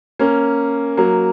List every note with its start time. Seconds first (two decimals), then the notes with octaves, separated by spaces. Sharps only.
0.19 A#3 C#4
0.97 F#3 A#3